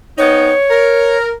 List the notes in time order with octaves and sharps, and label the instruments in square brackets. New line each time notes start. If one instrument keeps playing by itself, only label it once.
[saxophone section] B3 C4 D#4 [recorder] C#5
[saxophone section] A#4